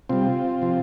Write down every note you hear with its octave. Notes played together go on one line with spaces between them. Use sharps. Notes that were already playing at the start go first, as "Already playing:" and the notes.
C3 G3 C4 F4
C3 F3